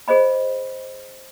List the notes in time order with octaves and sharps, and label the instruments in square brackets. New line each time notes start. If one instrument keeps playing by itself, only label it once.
[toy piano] G#4 C5 D#5 B5